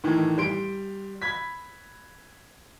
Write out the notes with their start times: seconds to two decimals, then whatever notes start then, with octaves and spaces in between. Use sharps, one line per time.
0.04 A2 D#3 E3
0.38 G3 C6 D7
1.22 B5 G#6 B6